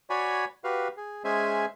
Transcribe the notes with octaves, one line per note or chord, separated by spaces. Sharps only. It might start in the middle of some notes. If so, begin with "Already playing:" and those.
F#4 C#5 D5 G#5 B5
F#4 G4 B4 F5
G#4
G#3 C#4 G#4 C5 E5 G#5